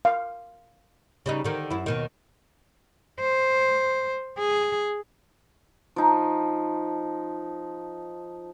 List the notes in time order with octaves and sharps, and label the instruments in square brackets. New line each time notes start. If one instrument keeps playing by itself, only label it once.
[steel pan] F5
[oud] C#3 G3 D#4
D3 D#3
F#2 E4
D#2 B2 D#3
[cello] C5
G#4
[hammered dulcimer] F3 D#4